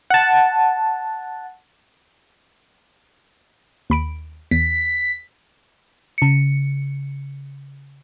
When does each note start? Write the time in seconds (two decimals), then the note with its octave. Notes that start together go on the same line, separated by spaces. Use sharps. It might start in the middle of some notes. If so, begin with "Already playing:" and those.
0.10 F#5 A5
3.90 D#2 B5 D7
4.51 E2 B6
6.18 C#3 C#7